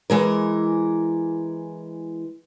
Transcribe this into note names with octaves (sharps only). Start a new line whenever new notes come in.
E3 G#3 A#4